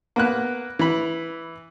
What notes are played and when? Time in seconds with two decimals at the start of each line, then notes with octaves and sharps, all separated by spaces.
0.16 A#3 B3 F#6
0.79 E3 B5